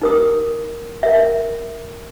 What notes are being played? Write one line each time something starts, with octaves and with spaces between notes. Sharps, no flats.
D#4 A#4 D#6
A#4 E5